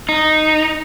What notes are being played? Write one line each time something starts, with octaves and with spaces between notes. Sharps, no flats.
D#4